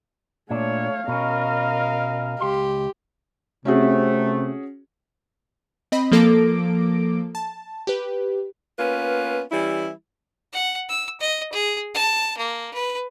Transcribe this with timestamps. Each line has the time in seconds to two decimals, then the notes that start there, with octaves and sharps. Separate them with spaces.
0.51 A#2 A3 D4 C#5 F5
1.08 B2 C#4 A#4 D#5
2.41 C#2 G4 C6
3.65 C3 A3 C#4 F#4 G#4
5.92 C4 D#5 B5
6.12 F3 A#3 A4 D6 A#6 D7
7.35 A5
7.87 G4 B4
8.79 A#3 B3 C#4 F4 B4
9.52 E3 G3 C#4 E4
10.53 F#5
10.89 E6
11.20 D#5
11.52 G#4
11.95 A5
12.38 A#3
12.74 B4